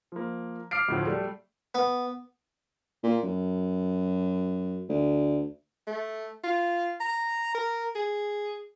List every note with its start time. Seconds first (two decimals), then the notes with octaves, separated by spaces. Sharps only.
0.12 F3 A#3
0.71 D6 F6 C7 D7
0.88 D2 A2 F3
1.07 G3 A3
1.75 B3
3.03 A#2
3.23 F#2
4.89 D2
5.87 A3
6.44 F4
7.00 A#5
7.54 A#4
7.95 G#4